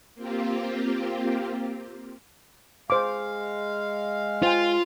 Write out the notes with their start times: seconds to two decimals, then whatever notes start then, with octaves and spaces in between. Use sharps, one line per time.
0.15 A#3 C4 F4 G4
2.90 G#3 C5 F5 D6
4.43 F4 C5 G5 G#5